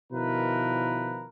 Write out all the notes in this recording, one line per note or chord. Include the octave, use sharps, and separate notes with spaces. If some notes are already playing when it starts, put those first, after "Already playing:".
B2 D#3 F3 E4 A#4 B4